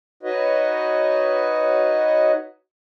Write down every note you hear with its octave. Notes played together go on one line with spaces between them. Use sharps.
D#4 F#4 B4 C#5 D#5